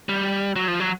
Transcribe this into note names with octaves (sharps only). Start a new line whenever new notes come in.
G3
F#3
F3
F#3